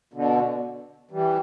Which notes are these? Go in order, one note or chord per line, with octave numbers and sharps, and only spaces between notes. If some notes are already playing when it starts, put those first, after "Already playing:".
B2 D3
E3 G3